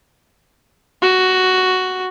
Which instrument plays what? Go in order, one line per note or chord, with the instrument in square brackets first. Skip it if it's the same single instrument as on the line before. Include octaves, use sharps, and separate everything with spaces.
[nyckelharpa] F#4